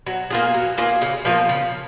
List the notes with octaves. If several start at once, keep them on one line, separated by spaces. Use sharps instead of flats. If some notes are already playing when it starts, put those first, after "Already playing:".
F#3
A#3 F4 G#4
F#3
A#3 F4 G#4
C#3
F3 A#3 F4
C#3